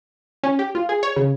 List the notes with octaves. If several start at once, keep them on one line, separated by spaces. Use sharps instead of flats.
C#4
G4
F4
G#4
C#5
C#3